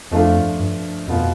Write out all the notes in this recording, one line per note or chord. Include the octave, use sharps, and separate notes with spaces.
F2 F3 A3 D4 F4
G2
G2
F2 B2 B3 F4